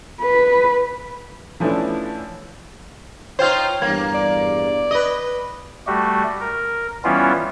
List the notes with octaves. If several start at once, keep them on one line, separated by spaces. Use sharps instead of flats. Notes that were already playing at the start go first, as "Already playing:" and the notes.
B4
E3 F3 A3 C#4 D4 E4
D#4 F4 C5 C#5 G5 F6
E2 G2 A#3 G#6
D5
B4 D#5
G3 A3 F#4 G4
A#4
E3 G3 B3 C#4 E4 F4